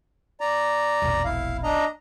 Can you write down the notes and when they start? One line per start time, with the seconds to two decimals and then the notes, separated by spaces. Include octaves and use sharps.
0.41 D5 A#5
1.02 E1 A#1
1.25 E4 F5
1.64 D4 D#5 A#5